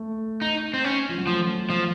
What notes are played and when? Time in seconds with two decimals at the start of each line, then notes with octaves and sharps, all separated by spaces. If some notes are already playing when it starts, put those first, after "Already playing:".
Already playing: A3
0.42 D#4
0.74 C4
0.84 C#4
1.09 F3
1.18 F#3
1.27 F3 A3
1.70 F3